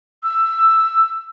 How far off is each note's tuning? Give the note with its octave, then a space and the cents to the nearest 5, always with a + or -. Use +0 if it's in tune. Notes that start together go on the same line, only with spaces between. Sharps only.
E6 +10